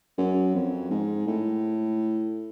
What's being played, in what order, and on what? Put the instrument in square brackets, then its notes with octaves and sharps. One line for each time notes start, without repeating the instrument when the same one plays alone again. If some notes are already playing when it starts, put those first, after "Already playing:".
[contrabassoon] F#2
F2
G#2
A2